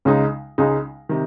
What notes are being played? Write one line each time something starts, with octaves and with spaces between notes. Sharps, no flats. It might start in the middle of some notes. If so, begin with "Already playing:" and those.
C#2 C#3 G#3 D#4
C#2 C#3 G#3 D#4
C3 D#3